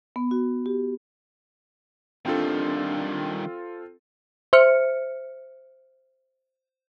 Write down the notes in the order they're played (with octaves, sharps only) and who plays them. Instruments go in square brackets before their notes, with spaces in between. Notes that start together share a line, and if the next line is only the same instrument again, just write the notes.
[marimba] B3
F#4
G4
[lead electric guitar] D#3 G3 [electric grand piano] C4 F4 A4 [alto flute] D4
[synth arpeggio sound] C5 E5 F6 C#7